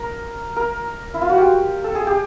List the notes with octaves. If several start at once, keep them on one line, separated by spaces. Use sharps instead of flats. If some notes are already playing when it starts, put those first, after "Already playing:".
Already playing: A#4
A#4
E4
F4
F#4
G4
A4
G#4
G4